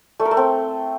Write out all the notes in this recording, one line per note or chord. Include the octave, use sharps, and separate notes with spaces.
A3
A#4
A3
C4